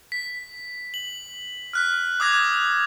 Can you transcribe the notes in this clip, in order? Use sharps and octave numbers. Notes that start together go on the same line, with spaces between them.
B6
F#7
F6 F#6 B6
D6 D#6 F#6 G#6 A#6